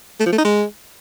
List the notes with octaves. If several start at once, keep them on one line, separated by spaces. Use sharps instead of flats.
A3
F3
A3
D#4
G#3